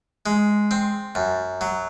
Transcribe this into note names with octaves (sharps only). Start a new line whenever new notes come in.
G#3
C4
F#2
F#3